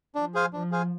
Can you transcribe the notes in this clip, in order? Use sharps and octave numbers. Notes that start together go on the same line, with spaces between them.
F3 D4
G#4 C5 F5 G#5
F3 D4
G#4 C5 F5 G#5